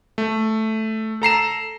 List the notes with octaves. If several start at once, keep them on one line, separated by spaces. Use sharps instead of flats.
A3
A4 A#5 C7 E7